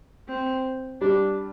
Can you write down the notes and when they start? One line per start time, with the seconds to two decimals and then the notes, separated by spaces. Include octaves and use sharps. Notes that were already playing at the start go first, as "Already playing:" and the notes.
0.28 C4
1.01 G3 D4